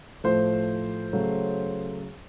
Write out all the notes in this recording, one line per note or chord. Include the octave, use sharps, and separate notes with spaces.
A2 F3 A3 C5
C#3 F#3 A3